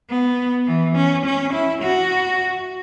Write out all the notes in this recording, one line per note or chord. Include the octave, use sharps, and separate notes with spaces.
B3
E3
C#4
C#4
E4
F#4